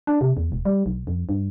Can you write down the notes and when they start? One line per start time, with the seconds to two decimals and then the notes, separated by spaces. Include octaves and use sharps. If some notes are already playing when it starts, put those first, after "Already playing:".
0.07 D4
0.21 C3
0.37 E2
0.52 E1
0.65 G3
0.86 B1
1.07 F2
1.29 G2